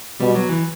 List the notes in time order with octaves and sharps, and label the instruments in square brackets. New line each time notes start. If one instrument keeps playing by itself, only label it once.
[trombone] B2 [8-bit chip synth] G3
[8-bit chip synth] F#3
E3